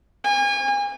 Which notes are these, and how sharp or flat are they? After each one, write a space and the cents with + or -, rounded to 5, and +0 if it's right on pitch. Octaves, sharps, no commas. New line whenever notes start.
G#5 -35